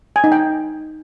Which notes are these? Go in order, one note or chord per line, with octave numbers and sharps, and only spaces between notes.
G#5
D#4
G5